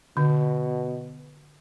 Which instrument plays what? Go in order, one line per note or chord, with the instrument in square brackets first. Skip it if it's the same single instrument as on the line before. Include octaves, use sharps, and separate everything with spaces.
[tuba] B2 [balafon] D3